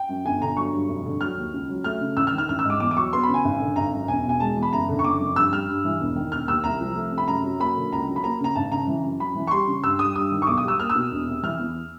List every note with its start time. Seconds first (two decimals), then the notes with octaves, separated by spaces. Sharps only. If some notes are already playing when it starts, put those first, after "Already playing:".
Already playing: G5
0.09 F#2
0.25 G1 G#5
0.41 D3 A#5
0.57 F#3 C#6
0.73 G2
0.88 F1
1.05 D3
1.21 F#3 F6
1.38 D#2
1.53 C#2
1.69 F#3
1.84 A3 F6
2.01 C#3
2.16 A1 E6
2.27 F6
2.33 D#3
2.38 F6
2.49 A1 F6
2.59 E6
2.65 G#2 D6
2.80 E2 D6
2.91 D6
2.96 F#3 C#6
3.13 B3 C6
3.23 B5
3.29 C#3
3.34 G#5
3.44 G#1
3.60 D3
3.76 G#1 A#5
3.93 F#2
4.08 E1 G#5
4.24 B2 G#5
4.40 G#3 A5
4.56 E2
4.63 B5
4.72 F#1 A#5
4.89 D3
4.99 C#6
5.04 F#1 D6
5.20 F2
5.36 G2 E6
5.53 G3 F6
5.68 G2
5.85 E3
6.00 E1
6.16 D#3
6.32 E1 F6
6.48 D#2 E6
6.64 C2 A#5
6.81 F3
6.96 A3
7.12 C3
7.18 B5
7.27 F#2 A#5
7.44 F#3
7.60 A#3 B5
7.76 D3
7.92 C#2 A#5
8.08 F#3
8.16 B5
8.24 A#3 A#5
8.40 C#3 A#5
8.55 G#1 A5
8.72 C#3 A#5
8.88 E3
9.04 F#2
9.20 F#2 B5
9.35 E3
9.47 C#6
9.51 G3 C6
9.67 C#3
9.83 G2 E6
9.99 G3 D#6
10.16 G2 D#6
10.32 D#3
10.42 C#6
10.47 B1 D6
10.57 D#6
10.64 G3 E6
10.80 A#3 F6
10.90 E6
10.95 B2
11.11 E1
11.28 C3
11.43 E3 F6
11.59 E2